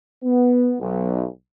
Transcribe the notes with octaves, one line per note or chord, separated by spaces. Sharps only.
B3
B1